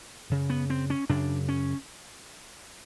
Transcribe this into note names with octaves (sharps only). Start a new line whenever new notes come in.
F#2 C#3
B3
C4
C#4
F#2 C#3 D4
C#4